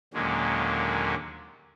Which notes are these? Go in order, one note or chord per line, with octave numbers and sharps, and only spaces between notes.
D#2 A#2 D3 F#3 G#3 C#4